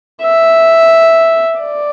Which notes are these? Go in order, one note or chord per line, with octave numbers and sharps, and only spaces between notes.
E5
D5